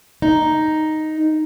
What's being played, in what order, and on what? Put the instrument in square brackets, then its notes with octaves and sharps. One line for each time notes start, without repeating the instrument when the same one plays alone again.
[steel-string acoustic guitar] D#4